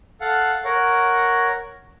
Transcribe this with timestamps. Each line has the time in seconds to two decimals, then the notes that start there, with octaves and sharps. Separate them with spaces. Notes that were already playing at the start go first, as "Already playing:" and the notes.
0.21 A4 F5 F#5
0.65 A#4 C#5 F#5